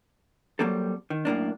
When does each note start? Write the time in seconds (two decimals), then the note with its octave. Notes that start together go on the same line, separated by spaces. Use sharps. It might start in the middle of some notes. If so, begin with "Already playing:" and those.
0.59 F#3 G3 A#3 C4 A4
1.10 D#3
1.25 F#2 A2 A#3 D4